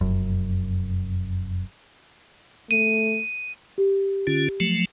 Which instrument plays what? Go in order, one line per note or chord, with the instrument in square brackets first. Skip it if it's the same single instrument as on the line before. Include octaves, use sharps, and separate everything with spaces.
[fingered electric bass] F1 F#2
[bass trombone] A3 [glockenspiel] D#7
[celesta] G4
[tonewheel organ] D3 C#4 F4
F3 F#3 A3